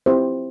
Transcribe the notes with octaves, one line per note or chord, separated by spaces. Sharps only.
C4 E4 G4 C5